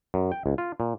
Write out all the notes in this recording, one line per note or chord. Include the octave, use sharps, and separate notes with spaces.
F#2
G5
C#2
F4
A#2